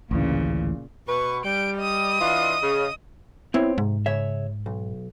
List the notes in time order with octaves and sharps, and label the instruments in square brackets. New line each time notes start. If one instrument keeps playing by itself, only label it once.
[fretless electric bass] A1 D2 E3 [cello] A#2 C#3
[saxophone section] B2 B4 [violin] C#6
[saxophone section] G3 [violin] G6 D7
[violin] D#5 D#6
[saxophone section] E3 D4 F4
C#3
[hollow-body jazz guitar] B3 C4 C#5 [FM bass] E4
[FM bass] G#2 [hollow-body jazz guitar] C3
[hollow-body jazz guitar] C#3 C#5 E5
B1